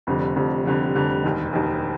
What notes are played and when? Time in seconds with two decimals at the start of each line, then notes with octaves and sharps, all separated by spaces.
0.07 F1 F2 D3 G3
0.36 F1 F2 D3 G3
0.65 F1 F2 D3 G3
0.95 F1 F2 D3 G3
1.24 E1 D#2 D#3
1.53 E1 D#2 D#3